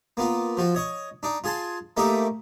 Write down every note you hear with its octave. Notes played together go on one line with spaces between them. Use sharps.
A#3 B3 F4
F3 F4 F#4
C#5 D#5 C#6
D4 D#4
F4 G#4 G#5 A5 C6
A3 A#3 D#4 G4 D#5 E5